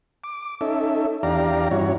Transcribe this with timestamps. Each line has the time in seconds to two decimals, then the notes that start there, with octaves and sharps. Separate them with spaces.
0.24 D6
0.61 C#4 D#4 A4 E5
1.23 E2 D4 G4 D5 F5 A#5
1.71 G2 C#4 E4 F#4 C#5